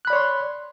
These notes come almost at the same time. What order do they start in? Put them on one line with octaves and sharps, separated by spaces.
F#6 B5 D5 C#5 C6